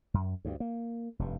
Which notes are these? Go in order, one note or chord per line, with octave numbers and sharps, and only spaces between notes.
F#2
D2 G2
A#3
F1 G2